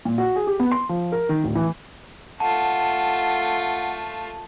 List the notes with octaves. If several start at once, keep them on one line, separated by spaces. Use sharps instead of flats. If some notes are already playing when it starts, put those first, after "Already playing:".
A#2
F#4
G#4
G4
B3
C6
F3
A#4
D#3
D1
E3
A3 F4 F#5 A5